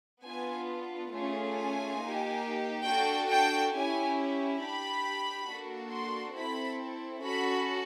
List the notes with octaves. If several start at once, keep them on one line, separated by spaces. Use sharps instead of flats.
B3 D4 F4 G#5
A3 C#4 F4 G#4
G#5
A#3 D#4 G4
D4 F#4 A4 G5
G5
C#4 E4 G4 G#5
D4 G4 B5
A#3 D4 F#4 A4
C6
C4 E4 A4 B5
C#4 F#4 A4 B5